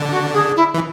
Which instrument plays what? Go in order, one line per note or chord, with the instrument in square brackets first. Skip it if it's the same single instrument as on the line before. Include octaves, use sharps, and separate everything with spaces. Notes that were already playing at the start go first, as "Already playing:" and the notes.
Already playing: [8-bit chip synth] D3 D4
[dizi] F#4
G#4
E4
[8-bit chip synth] E3